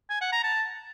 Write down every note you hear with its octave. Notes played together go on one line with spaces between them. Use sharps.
G#5
F#5
A#5
A5